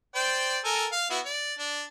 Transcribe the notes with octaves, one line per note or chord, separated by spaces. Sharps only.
C5 D5 G5
A4 A#4 G#5
F5
B3 E4 F#4
D5
D4